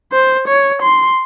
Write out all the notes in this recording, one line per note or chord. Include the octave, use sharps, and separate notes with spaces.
C5
C#5
C6